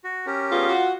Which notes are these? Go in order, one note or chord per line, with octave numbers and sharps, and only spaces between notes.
F#4
C#4 G4 A#4
G3 B3 F4 G#4
F#4